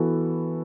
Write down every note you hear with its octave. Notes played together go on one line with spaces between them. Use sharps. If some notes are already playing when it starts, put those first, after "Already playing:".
Already playing: E3 B3 F#4 A4